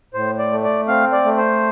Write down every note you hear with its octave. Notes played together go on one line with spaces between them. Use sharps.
A2 C5
D5
A3
D5
C4 F5
D5
A3
C5